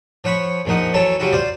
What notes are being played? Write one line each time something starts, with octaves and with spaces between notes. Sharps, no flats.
F3 C#5 F#5 B5 C#6
A#1 A#2 F3 D#4 F#5
E3 F#3 A4 C#5 A5
C#3 F#3 G3 E4 F#4
F4 C5 D5